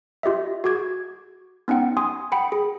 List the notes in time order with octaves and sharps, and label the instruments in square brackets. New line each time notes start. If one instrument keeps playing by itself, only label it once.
[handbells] F4 G4 D#5 E5
F#4 G#4 D6 G#6
B3 C#4 D#4 F#5 G5
G#5 C6 D#6
F#5 G5 B5 C#7
G#4